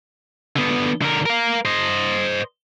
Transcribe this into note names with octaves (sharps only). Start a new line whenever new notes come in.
D3 B3
D3 A#4
A#4 F5
C5 D#5